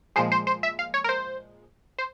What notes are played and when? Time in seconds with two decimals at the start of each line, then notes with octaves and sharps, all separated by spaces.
0.16 A#2 F3 G#3 C5
0.32 C5
0.47 C5
0.63 E5
0.79 F5
0.94 C#5
1.04 A#4
1.09 C5
1.99 C5